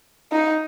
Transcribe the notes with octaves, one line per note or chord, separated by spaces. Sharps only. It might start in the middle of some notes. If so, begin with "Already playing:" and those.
D#4